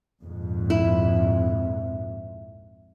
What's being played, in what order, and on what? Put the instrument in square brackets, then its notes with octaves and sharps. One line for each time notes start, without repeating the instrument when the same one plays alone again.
[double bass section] A#1 F2 G#2
[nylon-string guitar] E4